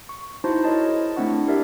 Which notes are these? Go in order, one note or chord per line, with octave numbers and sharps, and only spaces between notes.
C#6
D#4 E4 F#4 C5 A5 C6
E4 A#4 C#5 D#5 A5
G#4
A3 C4 D4 E4 F#5 C#6
G4 A#4 D5 E5